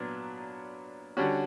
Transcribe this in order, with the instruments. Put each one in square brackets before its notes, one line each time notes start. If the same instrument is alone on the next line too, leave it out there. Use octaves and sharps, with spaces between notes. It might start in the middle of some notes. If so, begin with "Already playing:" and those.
Already playing: [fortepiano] A#2 F#3 B3 D4
D3 G3 C#4 F#4